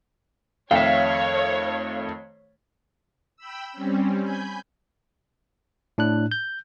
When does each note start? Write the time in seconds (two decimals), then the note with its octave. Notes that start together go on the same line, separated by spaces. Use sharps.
0.71 F2 D#3 A3 C#5 E5 F5 G5
3.36 G5 B5 E6
3.72 G3 C4 C#4
4.20 G#5 B5 G6
5.98 A2 D4 F#6
6.32 G6